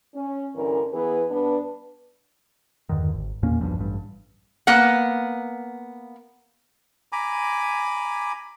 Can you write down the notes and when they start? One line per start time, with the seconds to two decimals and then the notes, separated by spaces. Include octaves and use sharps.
0.15 C#4
0.55 G2 D3 E3 C#4 A#4
0.92 E3 B3 G#4 B4
1.31 G2 B3 D4 B4
2.89 E2 G2 D3 D#3
3.13 G#1
3.43 E2 A#2 A#3 C#4
3.61 B1 E2 G2 F3
3.78 A1 G2
4.67 A#3 B3 F#5
7.12 G#5 A#5 B5 D6